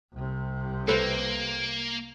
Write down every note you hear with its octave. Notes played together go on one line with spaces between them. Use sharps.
C2 C3
A#3 A4 B4 C5